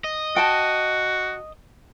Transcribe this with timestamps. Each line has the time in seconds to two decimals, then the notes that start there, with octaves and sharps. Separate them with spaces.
0.04 D#5
0.36 F#4 G5 A5